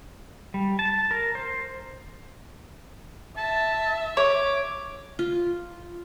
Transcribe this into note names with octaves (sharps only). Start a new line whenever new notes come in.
G3
A5
A#4
C5
E5 A5
C#5 D6
F4